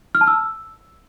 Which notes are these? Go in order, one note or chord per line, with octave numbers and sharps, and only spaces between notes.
F6
A5
E6